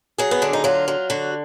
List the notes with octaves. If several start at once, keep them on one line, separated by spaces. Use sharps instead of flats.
F#3 G#4
B3
D3 D4
D#4
F#3 F4
F#3
D3 F#4